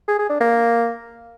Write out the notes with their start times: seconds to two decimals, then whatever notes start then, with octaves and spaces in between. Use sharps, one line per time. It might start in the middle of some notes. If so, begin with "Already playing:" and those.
0.08 G#4
0.19 G#4
0.30 D4
0.40 A#3